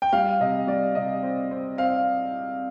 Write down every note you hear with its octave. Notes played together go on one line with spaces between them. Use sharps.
G5
G3 F5
C3 D#5
G3 D5
C3 D#5
C4
C4
C4 F5